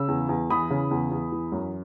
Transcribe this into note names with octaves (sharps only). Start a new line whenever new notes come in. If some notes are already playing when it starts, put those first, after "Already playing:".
Already playing: C#3 E6
E2
E2
E3 B5 D#6
C#3
E2
E2
E3
F#2